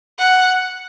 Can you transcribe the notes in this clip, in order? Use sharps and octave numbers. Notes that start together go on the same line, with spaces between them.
F#5